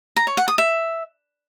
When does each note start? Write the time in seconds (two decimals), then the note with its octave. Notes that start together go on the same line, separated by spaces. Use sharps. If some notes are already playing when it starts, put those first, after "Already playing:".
0.16 A#5
0.27 C#5
0.37 F#5
0.48 D#6
0.58 E5